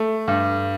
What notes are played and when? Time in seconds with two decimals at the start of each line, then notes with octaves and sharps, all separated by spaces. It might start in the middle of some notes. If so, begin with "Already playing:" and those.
Already playing: A3
0.28 G2